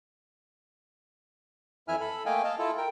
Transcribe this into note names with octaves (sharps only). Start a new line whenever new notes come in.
F2 E3 E4 E5 G#5 F6
A4 B5
A3 A#3 D#5 F5 G5 G#5
D#5 F5 A5
E4 F4 A4
A#4 G5